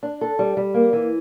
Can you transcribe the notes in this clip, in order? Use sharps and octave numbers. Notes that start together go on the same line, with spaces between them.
D4
A4
G3
G3
A#3
E3